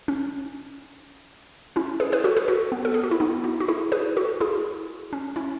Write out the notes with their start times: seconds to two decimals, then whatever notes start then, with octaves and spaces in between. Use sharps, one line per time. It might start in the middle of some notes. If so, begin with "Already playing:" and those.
0.08 C#4
1.76 C#4 E4
2.00 G#4 B4
2.12 G#4 B4
2.24 F#4 A4
2.37 G#4 B4
2.48 F#4 A4
2.72 B3
2.85 A4
2.94 G#4
3.04 F#4
3.11 E4
3.20 B3 D#4
3.44 D#4 F#4
3.60 F#4
3.68 E4 G#4
3.92 G#4 B4
4.17 F#4 A4
4.40 E4 G#4
5.13 C#4
5.36 C#4 E4